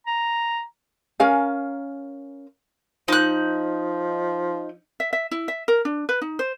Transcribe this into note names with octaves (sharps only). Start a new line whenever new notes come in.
A#5
C#4 A#4 F5 G#5
F3 D#4 F#6
E5
E5
E4
E5
A#4
D4
B4
D#4
C5